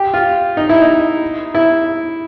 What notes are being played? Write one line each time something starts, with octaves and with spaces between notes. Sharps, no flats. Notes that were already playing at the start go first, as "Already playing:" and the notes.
Already playing: G4
F4
D#4
E4
D#4
E4